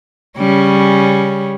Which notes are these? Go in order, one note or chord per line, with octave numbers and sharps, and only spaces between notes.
C#3 G3 C#4